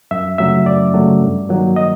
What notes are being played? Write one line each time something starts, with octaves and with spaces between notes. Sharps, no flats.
F#2 E5
C#3 F#3 A3 E5
F#2 D5
C#3 F#3 A3
G2
D#3 F#3 A#3
D#5